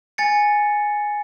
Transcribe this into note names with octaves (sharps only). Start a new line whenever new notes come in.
G#5 A6 C#7